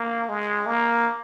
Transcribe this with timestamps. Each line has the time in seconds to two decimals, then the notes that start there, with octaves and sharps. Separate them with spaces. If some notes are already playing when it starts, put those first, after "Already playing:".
Already playing: A#3
0.28 G#3
0.66 A#3